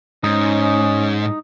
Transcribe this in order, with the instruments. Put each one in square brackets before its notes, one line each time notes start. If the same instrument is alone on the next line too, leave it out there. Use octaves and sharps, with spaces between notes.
[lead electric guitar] G#2 [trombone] C#4 [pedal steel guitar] D#4